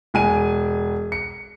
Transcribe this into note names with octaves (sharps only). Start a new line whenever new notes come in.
E1 G#5 D#7
C#7